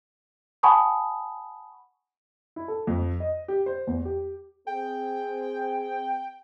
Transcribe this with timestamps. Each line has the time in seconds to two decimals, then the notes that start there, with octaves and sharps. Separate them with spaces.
0.63 F#5 G#5 A5 B5 C#6 D#6
2.56 E4
2.68 A4
2.87 F2
3.20 D#5
3.48 G4
3.66 C5
3.87 E2
4.05 G4
4.67 C4 G#4 G5